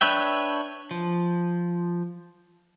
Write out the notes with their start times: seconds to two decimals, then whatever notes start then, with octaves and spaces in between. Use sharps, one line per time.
0.01 D4 B4 C#5 E5 G5
0.91 F3